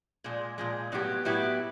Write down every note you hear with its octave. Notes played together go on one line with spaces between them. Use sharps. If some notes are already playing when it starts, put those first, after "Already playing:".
A#2 F3 G#3
A#2 F3 G#3
A2 F#3 B3 E4 G4
A2 F#3 B3 E4 G4